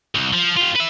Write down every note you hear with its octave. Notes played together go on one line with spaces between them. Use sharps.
C2
F3
F4 G4
B4 E5